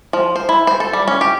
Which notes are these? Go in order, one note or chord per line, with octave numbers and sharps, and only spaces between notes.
F3
C5
E4
C5
A4
G3
C#4
G4